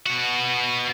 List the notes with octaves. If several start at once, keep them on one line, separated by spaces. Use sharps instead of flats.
B2 F#4